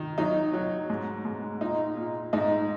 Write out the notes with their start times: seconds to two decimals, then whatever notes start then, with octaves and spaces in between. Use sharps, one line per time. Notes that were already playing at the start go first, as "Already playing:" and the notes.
Already playing: D#3
0.18 F#3 D#4
0.53 F#3
0.90 G#2
1.25 G#2
1.61 A#2 D#4
1.96 A#2
2.33 G#2 D#4